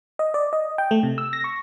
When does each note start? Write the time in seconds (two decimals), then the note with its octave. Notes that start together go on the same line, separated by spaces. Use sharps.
0.19 D#5
0.34 D5
0.53 D#5
0.78 G5
0.91 A3
1.03 C3
1.18 E6
1.33 A#6
1.44 C#6